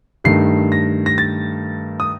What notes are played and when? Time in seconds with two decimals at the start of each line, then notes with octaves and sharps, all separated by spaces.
0.24 G2 D#3 A3 C7
0.72 A#6
1.06 A#6
1.18 A6
2.00 D#6